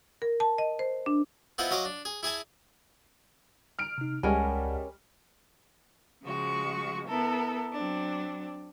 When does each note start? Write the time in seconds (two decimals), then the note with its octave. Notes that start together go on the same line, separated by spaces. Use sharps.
0.22 A#4
0.40 A5
0.58 D#5
0.79 C5
1.06 D4
1.58 B3 C4 E4 F4 D#5 F#5
1.71 F#3 D#5 F5 C6 D6
1.85 D4
2.05 G#4
2.23 E4 G#4 G#5 A5
3.79 F6 D7
3.98 C3 D#4
4.23 C#2 G3 G#3 C#4 A#4 F#5 G#5 A5
6.24 C#3 F3 G#3 F#4 C#6
7.07 B3 E4 A4 A#4
7.73 F#3 C4 D4